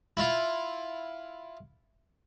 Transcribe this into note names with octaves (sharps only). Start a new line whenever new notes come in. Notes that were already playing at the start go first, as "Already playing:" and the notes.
E4 F4